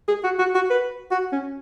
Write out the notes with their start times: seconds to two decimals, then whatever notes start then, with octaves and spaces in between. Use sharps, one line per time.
0.08 G#4
0.24 F#4
0.39 F#4
0.55 F#4
0.70 B4
1.11 F#4
1.32 C#4